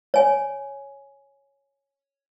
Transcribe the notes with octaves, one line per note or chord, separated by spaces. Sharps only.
C#5 G#5